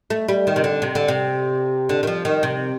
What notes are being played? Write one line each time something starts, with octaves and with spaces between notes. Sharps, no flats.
A3
G3
D#3
C3
D3
C3
D3
C3
D3
D#3
F3
D#3
C3